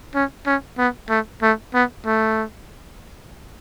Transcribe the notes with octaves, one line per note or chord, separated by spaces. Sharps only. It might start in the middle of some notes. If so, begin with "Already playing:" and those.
C#4
C#4
B3
A3
A3
B3
A3